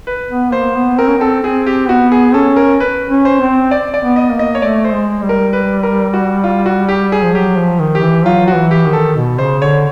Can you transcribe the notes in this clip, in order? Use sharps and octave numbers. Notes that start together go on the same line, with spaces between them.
B4
B3
A#3 C5
B3
C4 A#4
C#4
C4 A4
C4 G#4
G4
B3 F#4
G#4
C#4 A4
A#4
B4
C#4
C5
C4
D5
D5
B3
D#5
A#3
D#5
C#5
A3 D5
C5
G#3
G3
A#4
B4
A#4
F#4
F4
F#4
G4
G#4
F3
F#3 G4
F3
D#3
G4
E3
F#3 F4
F#4
E3
G4
D#3
A4
B2
C#3 C5
D3 C#5